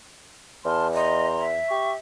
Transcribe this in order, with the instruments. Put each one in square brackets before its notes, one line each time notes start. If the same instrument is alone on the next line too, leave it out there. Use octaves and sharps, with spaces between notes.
[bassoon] E2 [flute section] A5 C6 F6
[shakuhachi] D#5 [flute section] A#5 C6
[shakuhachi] E5
[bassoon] G4 [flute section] C#6